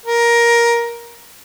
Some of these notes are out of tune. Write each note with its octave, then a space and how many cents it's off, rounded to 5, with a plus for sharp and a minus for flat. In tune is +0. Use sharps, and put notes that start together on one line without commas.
A#4 +15